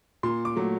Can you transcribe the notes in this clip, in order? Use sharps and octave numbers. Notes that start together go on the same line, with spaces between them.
A#2 C6
D6
F#3 A3